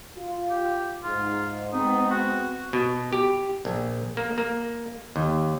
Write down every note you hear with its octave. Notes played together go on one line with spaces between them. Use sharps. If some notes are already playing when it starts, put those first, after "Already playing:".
F4
G4
G#2 F4
G#3 B3 C4 D#4
F#4
B2
G4
A#1
A#3
A#3
D#2